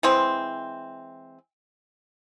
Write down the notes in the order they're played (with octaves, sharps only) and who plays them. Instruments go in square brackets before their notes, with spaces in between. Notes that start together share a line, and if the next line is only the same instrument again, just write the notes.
[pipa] E3 G#3 C4